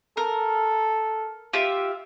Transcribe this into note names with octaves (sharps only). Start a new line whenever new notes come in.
A4 A#4
F4 G4 E5